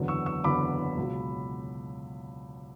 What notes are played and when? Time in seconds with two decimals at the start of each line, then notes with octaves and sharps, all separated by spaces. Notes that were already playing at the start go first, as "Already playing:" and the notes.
Already playing: F#1 E2 D3 F#3 B3
0.08 C#6 E6
0.26 C#6 E6
0.44 F#1 E2 D3 F#3 B3 B5 D6
0.97 C#2 B2 F#3